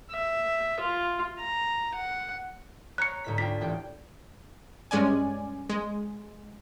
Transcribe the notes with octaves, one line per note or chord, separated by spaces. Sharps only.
E5
F4
A#5
F#5
C#5 A#5 C#6 F#6 C#7
D2 G#2 B6
D4 F4 G5 B6
A1 G4 G5
G2 G#3 C#4 D5 G#5
G#3